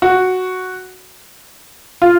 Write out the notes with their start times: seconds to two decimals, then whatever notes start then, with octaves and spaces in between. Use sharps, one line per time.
0.02 F#4
2.02 F4